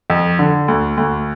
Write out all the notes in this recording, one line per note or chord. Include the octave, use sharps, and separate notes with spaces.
F2
D3
D2
D2